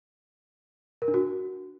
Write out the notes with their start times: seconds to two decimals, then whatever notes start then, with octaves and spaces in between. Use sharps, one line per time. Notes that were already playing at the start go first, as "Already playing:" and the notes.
1.02 A#4
1.08 D4
1.14 F#4